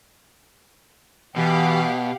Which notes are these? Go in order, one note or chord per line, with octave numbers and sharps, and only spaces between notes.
B2 E3 G4 F5 F#5